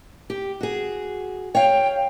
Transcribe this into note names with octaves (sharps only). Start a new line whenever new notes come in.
G4
F#4 G#4
C#5 F5 G5